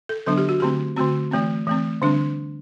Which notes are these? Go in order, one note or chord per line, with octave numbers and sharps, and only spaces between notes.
A4
D3 F#3 B3 D4 A4
G4
F#4
D3 A3 C4 G4
D3 A3 C4 F#4
E3 A3 C4
E3 A3 C4
D3 G3 C4 D4